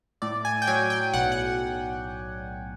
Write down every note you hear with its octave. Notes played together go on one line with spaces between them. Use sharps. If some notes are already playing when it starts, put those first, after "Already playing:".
A2 D5
G#5
G5
F#3 G#5
G5
B1 F#5
F#5